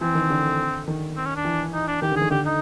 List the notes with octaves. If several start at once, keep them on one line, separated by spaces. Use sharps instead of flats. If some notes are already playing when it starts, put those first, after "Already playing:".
E3 C4
D#3
D3
D#3
C4
C#4
D4
E3
D#4
D4
D#3 G4
D3 G#4
D#3
D3 G4
D#4